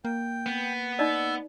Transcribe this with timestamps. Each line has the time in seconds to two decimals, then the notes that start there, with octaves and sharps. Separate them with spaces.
0.05 A#3 G5
0.46 B3
0.99 D#4 D5 D#5 E6